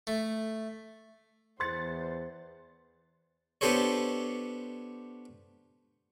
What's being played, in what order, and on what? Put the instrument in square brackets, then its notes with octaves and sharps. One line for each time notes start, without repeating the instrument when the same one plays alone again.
[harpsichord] A3
[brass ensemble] E2 [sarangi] C5 [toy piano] C6 [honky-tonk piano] F#6 A6 C#7
[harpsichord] B3 D4 G4 A4 C5 C#5